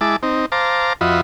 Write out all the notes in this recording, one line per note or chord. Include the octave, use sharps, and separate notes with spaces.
G#3 E4 A5 D6
C4 D#4
C5 F5 A5 A#5 D6
F2 F4 F#4 D#5 E5 B5